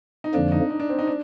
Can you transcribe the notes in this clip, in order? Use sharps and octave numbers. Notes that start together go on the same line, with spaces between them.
D#4
F2 D3 F3 A#3 D4
D#4
D#4
D4
C4
D#4
D4